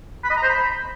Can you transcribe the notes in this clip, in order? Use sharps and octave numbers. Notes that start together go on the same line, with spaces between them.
B5
D#5
A#5
C5
B5